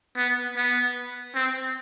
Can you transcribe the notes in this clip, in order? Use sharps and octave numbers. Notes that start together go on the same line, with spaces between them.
B3
B3
C4